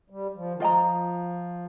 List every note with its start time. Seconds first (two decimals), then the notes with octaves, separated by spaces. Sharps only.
0.10 G3
0.35 F3
0.54 D#3
0.60 F3 F4 D#5 G5 A#5